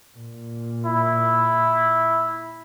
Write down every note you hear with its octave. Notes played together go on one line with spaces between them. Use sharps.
A#2
E4